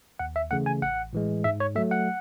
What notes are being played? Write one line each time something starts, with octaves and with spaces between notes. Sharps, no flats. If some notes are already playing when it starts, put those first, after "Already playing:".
D#2 F#5
E5
C#3 E3 A3 F#5
G#5
A1 F#5
A2 E3 G#3
G#2 E5
C#5
F#3 A3 E5
F#5